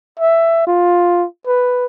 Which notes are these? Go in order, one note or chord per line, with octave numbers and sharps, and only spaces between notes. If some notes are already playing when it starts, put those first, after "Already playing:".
E5
F4
B4